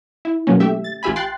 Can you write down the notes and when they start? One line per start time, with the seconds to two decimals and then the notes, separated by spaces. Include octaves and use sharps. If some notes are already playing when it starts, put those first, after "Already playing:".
0.25 E4
0.47 B2 D#3 F#3 G#3 A#3 C#4
0.60 A3 G4 E5
0.84 A6
1.03 A1 F4 G4 E5 G#5 B5
1.16 G5 C6 F#6 A6 C7